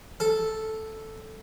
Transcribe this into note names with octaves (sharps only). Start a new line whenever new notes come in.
A4